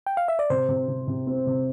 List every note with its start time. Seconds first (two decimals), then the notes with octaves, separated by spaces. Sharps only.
0.07 G5
0.17 F5
0.28 E5
0.39 D5
0.50 C3 C5
0.69 C3
0.88 C3
1.08 C3
1.27 C4
1.47 C3